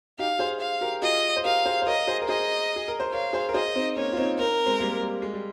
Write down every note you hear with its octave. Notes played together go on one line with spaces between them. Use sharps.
D#4 G4 F5
G#4 C5
F5
G4 A#4
F4 G#4 D#5
C5
G4 A#4 F5
G#4 C5
C5
A#4 C#5 D#5
G#4 C5
A#4
G#4 C5 D#5
G#4
A#4
C5
A#4 C#5 F5
G#4 C5
A#4
G#4 C5 D#5
C4 D#4
A#3 C#4 C#5
F4
C4 D#4
C4 D#4 A#4
G#3 C4
G3 A#3
G3
G#3
G3